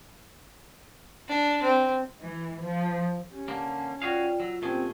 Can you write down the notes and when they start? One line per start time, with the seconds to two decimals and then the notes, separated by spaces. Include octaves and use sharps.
1.29 D4
1.62 C4
2.20 E3
2.59 F3
3.30 C#4 G4
3.48 D3 A#3 A5
4.02 F4 F#4 G#4 D5 F5 G5
4.40 F#3 F4 E6
4.62 A#2 A3 C4 C#4 F4 G4 G#4